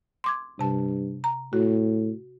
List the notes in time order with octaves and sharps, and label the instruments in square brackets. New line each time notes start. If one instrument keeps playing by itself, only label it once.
[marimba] C6 D6 G#6
[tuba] G2 [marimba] C3 A5
[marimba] A#5
[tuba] A2 [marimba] F#4